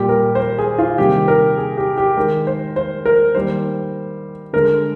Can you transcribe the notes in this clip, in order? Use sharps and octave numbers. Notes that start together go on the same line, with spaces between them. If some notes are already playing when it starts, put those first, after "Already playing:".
Already playing: A#2 G3 A#3 G4
A#4
C5
A#4
G#4
F4
C3 D#3 G3 A#3 G4
A#4
G#4
G4
G4
D#3 G#3 A#4
C5
C5
A#4
D#3 G3 A#3 C5
D3 G#3 A#4